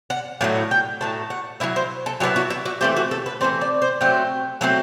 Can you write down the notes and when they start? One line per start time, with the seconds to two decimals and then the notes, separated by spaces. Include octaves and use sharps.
0.10 F#5
0.41 A2 F#3 A3
0.71 G5
1.01 A2 F#3 A3 A5
1.30 F#5
1.60 F#3 B3 E4 E5
1.76 C5
2.06 A4
2.20 F#3 B3 E4 G4
2.36 F#4
2.50 E4
2.66 F#4
2.81 E3 A3 C4 G4
2.96 F#4
3.11 A4
3.26 B4
3.41 E3 A3 C4 C5
3.61 D5
3.82 C5
4.01 F#3 A3 C4 G5
4.61 F#3 A3 C4